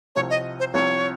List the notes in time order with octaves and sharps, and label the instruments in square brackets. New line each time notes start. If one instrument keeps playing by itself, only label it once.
[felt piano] C2 C3 F3 C4 [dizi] C#5
[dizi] D#5
C5
[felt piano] C2 C3 F3 C4 [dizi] C#5